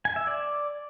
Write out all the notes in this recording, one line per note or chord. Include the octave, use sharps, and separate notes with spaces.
G#5
E5
D5